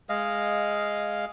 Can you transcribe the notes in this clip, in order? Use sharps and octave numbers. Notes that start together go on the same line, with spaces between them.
G#3 D#5 F5